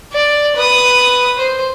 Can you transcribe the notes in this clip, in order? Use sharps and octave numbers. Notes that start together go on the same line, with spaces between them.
D5
B4 D#6
C5